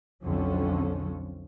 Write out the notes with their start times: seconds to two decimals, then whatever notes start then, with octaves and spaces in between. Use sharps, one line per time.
0.23 B1 F2 D3 F3 C#4